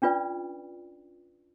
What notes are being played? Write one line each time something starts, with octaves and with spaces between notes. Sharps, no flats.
C#4 D4 F4 B4 D5